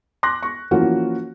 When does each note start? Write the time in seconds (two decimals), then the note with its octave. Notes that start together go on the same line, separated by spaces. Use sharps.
0.23 C6 D6 F#6 A#6
0.43 C#6
0.71 E3 F3 A#3 C#4 F4 F#4